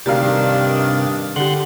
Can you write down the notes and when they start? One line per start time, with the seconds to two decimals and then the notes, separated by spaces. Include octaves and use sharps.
0.06 D2 C3 D#3 D4 G4 A#4 F5 A6
0.23 G2
1.36 D3 G4 F#5 C6 F#6